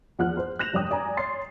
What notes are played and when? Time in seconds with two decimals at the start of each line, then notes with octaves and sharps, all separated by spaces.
0.19 E2 F3 F#5 F6 F#6
0.37 C5
0.59 F#6 G6 A#6 E7 F7
0.73 F1 G2 C#5 G5 D#6
0.91 D5 G#5 A#5
1.17 C#5 C6 A6 C7